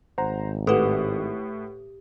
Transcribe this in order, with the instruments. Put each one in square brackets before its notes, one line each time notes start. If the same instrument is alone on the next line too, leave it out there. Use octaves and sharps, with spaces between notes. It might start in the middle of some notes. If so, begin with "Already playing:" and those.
[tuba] G#1 [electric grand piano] C5 F#5 A#5
[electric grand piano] A2 F#5 [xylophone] G4 D#6 [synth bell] A4 B4